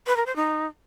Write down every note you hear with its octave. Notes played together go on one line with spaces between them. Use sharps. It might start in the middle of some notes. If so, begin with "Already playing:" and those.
B4
A#4
C5
D#4